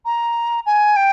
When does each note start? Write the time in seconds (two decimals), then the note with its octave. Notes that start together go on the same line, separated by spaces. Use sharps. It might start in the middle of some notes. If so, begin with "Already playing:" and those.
0.05 A#5
0.66 G#5
0.96 G5